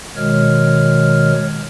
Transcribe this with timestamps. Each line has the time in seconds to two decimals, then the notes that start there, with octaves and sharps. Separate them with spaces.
0.16 B2 D#3 G#3 C#5 F6